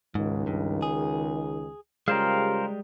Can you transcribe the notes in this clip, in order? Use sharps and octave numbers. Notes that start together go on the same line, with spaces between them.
C#2 G#2 D#3
G2
G#4
C#3 G3 G#3 F4 G4 A#4 C5 F5